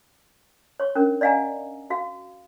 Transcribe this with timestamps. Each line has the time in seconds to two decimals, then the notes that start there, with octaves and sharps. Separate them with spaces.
0.80 C#5 C#6
0.95 C#4 D4 A#4
1.21 D5 D#5 F5 F#5 G#5 A#5
1.90 F#4 F5